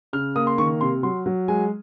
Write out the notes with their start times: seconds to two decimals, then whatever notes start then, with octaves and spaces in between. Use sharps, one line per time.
0.13 C#3 F6
0.35 A#3 D#6
0.47 C6
0.58 D#3 C#6
0.81 C3 C6
1.03 F#3 C6
1.26 F#3
1.48 G#3 G#5